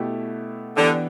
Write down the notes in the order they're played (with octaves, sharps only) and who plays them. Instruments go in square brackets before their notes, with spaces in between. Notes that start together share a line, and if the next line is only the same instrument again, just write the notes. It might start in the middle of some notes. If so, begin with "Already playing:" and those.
Already playing: [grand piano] B2 A3 E4 G4
[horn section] D3 [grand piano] E3 B3 D4 G4